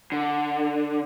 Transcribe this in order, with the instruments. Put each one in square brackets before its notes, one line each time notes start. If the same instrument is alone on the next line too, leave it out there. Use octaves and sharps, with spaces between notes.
[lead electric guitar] D3